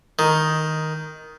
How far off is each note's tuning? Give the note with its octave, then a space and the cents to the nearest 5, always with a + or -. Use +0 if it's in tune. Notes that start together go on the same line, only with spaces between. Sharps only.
D#3 +5